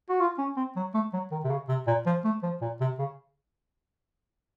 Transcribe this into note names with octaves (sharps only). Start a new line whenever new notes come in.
F#4
F4
C#4
C4
F#3
A3
F#3
D#3
C3
C#3
C3
A#2
F3
A3
F3
A#2
C3
C#3